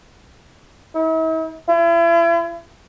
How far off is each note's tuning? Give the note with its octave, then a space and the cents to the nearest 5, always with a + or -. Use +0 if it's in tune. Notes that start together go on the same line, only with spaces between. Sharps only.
E4 -45
E4 +40